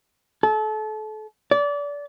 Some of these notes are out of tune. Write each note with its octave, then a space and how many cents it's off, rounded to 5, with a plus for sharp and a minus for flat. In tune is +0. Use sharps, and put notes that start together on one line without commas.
A4 -30
D5 -25